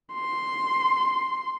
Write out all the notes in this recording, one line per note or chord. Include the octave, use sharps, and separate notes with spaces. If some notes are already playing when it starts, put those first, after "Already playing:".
C6